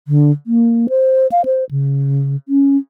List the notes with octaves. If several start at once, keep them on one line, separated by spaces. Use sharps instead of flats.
D3
A#3
C5
F5
C5
C#3
C#4